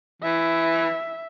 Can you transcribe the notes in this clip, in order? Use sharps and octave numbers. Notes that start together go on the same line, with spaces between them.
E3 E5